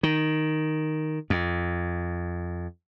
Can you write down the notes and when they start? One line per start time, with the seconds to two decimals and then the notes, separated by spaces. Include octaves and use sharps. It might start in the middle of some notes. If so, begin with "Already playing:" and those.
0.03 D#3
1.30 F2